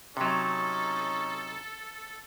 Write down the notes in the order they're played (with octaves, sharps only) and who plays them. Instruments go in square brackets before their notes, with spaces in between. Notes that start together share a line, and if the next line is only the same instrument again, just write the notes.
[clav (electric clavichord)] C3 F#3 [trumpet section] C#4 D#4 [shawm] A4